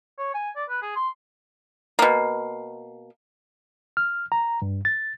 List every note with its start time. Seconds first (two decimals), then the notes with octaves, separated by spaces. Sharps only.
0.19 C#5
0.34 G#5
0.56 D5
0.69 B4
0.82 G#4
0.96 C6
1.99 B2 A#3
3.97 F6
4.32 A#5
4.62 G2
4.85 A6